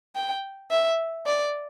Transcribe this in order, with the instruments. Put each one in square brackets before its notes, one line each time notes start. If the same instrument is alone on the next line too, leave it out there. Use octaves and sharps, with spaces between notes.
[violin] G5
E5
D5